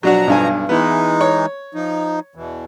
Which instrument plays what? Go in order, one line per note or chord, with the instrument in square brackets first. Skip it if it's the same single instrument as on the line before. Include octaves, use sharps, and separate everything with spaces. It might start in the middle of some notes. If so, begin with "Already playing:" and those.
[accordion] B2 F3 A#5 [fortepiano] F#3 D4 F#4
[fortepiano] B1 G2 G#5
[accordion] E3 G#3 D#4 [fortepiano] B3 E4
[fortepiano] C#5
[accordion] F3 D#4
E2 B2 E3